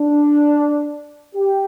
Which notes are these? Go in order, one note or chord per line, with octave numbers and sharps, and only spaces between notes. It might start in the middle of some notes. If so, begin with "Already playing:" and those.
Already playing: D4
G4